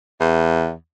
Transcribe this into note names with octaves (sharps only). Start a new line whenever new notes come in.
E2